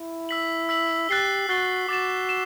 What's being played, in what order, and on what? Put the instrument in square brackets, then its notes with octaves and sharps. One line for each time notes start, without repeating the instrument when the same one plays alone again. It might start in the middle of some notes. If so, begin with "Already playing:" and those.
Already playing: [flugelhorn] E4
[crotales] E6 B6 F#7
E6 B6 F#7
[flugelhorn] G4 [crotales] F#6 A6 C7 G7
[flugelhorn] F#4 [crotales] F#6 A6 C7 G7
[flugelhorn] F#4 [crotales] D6 A6 E7
[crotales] E7